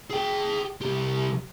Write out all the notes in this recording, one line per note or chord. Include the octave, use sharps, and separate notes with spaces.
G#4 G5
C2 G4